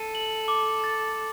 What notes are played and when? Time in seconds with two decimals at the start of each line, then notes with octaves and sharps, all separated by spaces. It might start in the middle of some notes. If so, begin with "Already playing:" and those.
Already playing: A4 C7 D#7
0.15 F#7
0.48 D6
0.84 A6